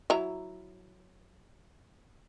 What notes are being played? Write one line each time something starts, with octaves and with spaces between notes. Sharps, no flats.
F#3 E4 A#5